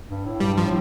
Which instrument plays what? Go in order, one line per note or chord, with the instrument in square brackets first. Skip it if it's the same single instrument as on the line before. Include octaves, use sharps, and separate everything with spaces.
[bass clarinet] G2
A2
[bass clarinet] G2 [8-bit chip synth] G3
[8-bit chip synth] F3
[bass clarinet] A2